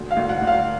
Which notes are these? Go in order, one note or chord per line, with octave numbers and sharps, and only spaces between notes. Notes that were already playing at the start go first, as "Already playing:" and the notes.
Already playing: D2
F5
D2
F#5
D2
F5